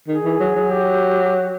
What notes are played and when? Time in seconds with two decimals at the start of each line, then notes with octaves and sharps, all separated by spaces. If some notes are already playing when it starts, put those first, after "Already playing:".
0.08 D#3 G#4
0.24 E3
0.40 F#3
0.56 F#3
0.72 G4
1.24 G4
1.36 F#4